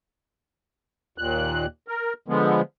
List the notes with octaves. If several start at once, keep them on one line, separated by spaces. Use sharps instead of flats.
D#2 A#2 F#6
A#4
D3 F3 G#3 B3